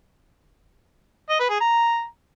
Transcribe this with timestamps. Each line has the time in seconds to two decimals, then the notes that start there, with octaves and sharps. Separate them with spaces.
1.29 D#5
1.39 B4
1.50 G#4
1.60 A#5